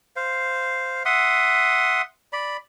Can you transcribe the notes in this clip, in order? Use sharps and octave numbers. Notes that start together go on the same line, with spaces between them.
C5 F5
E5 F#5 C6 D#6
D5 B5